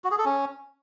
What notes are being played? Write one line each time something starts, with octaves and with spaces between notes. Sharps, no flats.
F#4
G#4
A4
C#4